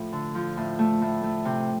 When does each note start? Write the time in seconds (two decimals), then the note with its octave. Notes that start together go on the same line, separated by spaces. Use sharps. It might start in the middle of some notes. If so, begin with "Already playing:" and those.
Already playing: A2 F3
0.12 D3
0.35 F3
0.57 A2
0.79 A3
1.02 A2
1.23 A3
1.45 C3